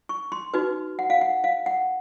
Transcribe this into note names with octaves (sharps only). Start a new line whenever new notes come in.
C#6
C6
D#4 F#4 B4
F#5
F5
F#5
F5
F#5